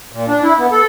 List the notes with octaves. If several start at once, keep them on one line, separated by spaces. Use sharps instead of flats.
A#2
D4
E4
B3
A4